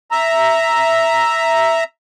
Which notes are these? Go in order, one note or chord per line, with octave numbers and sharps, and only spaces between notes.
E5 A#5